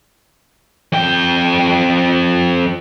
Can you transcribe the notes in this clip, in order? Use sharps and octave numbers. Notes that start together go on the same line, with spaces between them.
F2 G5